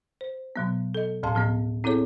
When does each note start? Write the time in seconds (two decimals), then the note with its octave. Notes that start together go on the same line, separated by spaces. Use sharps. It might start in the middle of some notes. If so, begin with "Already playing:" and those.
0.21 C5
0.56 B2 F#3 B3
0.94 A4 D#5
1.23 D2 A2 F5 A5 C6
1.35 A2 F3 B3
1.84 C4 E4 G#4 A4 C#5